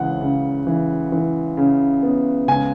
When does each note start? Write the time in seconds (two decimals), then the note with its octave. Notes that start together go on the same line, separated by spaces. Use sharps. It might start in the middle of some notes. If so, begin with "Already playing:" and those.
Already playing: C#2 E3 F#5
0.21 C#3
0.67 E3
1.12 E3
1.57 C#3
2.03 B3
2.48 C#2 G#5